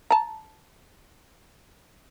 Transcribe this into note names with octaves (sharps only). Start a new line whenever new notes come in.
A5 A#5